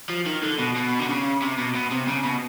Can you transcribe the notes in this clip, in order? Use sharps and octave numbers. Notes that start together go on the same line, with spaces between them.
F3
D#3
D3
B2
B2
D3
C#3
C3
B2
B2
C3
C#3
B2